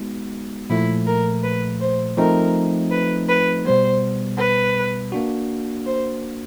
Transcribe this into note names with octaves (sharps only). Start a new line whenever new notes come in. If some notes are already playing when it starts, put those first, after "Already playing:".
Already playing: G#3 B3 D#4 F#4
A#2 F3 A3 E4
A#4
B4
C5
F3 A3 C4 D#4 A#4
B4
B4
B2 G3 B3 C5
B4
A#3 D4 F#4
C5